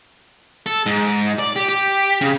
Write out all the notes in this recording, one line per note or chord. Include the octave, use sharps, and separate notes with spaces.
A4
G#2
D5
G4
G4
C#3